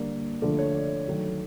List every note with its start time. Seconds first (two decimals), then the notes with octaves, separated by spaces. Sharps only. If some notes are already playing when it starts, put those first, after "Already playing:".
Already playing: D3 G3 A#3 D5
0.42 D3 F3 A3 D5
0.59 C#5
0.75 D5
1.08 D#3 F#3 A3